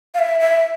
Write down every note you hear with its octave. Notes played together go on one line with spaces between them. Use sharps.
F5
E5
E5